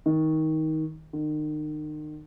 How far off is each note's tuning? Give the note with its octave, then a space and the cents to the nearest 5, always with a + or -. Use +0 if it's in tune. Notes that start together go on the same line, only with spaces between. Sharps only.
D#3 +20
D#3 -35